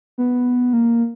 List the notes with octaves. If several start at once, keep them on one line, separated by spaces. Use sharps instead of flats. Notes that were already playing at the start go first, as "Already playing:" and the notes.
B3
A#3